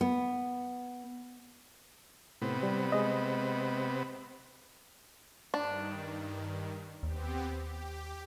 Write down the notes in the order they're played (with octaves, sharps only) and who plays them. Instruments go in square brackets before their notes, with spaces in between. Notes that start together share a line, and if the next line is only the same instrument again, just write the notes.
[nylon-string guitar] B3
[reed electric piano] A2 [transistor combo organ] C3 B3
[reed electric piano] G3
G#3 D#5
[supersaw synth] G2 D#3 [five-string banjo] D4
[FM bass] D#2 [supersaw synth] B3 C4 G4
[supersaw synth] G4